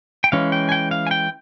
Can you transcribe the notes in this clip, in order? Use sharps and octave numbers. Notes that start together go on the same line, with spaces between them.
G5
E3 G#3 C#4 F5
G5
G#5
G5
F5
G#5
G5